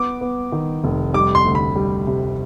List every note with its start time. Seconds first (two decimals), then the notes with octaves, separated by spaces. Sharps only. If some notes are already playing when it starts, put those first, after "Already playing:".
Already playing: B3 D6
0.21 B3
0.52 D#3
0.84 F1
1.14 G3 D6
1.35 C6
1.45 D2
1.55 B5
1.76 G3
2.07 C3